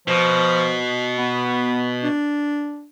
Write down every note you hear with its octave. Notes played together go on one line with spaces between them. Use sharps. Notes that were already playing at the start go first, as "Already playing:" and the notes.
B2 F3
B3
D4